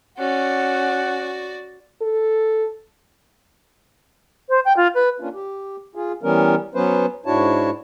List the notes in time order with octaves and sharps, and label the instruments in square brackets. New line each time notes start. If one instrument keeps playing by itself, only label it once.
[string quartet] C#4 [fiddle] F#4 D5 [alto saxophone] F#5
[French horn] A4
[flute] C5
G5
F4
B4
[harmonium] A#3 C#4 D4 F4
G4
F4 G#4
E3 G3 B3 C#4 A#4
F#3 B3 C#4 B4 C5
G#2 D4 E4 F#4 C#5 A5